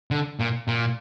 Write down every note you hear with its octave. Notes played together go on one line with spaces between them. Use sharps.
D3
A#2
A#2